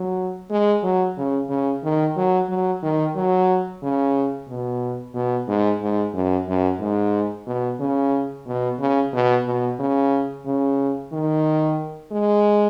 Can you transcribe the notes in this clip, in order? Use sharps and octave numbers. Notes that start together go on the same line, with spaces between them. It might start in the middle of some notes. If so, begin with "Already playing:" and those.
Already playing: F#3
G#3
F#3
C#3
C#3
D#3
F#3
F#3
D#3
F#3
C#3
B2
B2
G#2
G#2
F#2
F#2
G#2
B2
C#3
B2
C#3
B2
B2
C#3
C#3
D#3
G#3